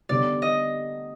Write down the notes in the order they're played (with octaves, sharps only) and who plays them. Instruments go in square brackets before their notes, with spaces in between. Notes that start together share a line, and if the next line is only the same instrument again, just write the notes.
[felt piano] D3 G3 B3 D#4 [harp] D5
[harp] D#5